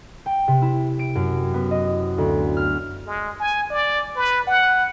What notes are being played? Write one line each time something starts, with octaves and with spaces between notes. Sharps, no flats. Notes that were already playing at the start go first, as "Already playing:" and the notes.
G5
C3
E4
D7
F#2
B3
D#5
D2
F6
G#3
G#5
D5
B4
F#5